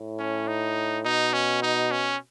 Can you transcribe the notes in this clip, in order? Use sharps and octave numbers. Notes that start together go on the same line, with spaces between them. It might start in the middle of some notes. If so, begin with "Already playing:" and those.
Already playing: A2
C#4
D#4
B2 D#4
C#4
D#4
C#4